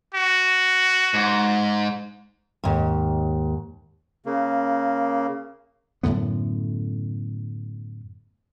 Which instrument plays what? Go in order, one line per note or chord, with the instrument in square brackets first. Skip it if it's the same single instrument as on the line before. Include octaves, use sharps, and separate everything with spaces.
[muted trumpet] F#4
[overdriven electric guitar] G#2
[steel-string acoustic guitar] D#2 G#2
[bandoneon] C#3 A#3
[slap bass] F#2 A2 D3 B3